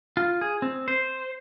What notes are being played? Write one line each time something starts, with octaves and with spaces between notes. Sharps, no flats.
F4
G#4
C4
C5